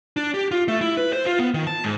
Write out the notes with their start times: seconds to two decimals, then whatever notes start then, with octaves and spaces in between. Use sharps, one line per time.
0.17 D4
0.34 G4
0.51 F4
0.68 A3
0.81 E4
0.97 B4
1.13 C5
1.26 F4
1.39 B3
1.54 D#3
1.67 A5
1.84 G#2